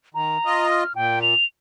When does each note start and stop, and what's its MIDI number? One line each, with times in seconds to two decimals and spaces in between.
0.14 0.37 51
0.14 0.67 82
0.45 0.84 65
0.45 0.84 75
0.70 0.93 89
0.95 1.34 46
0.95 1.22 79
1.22 1.44 101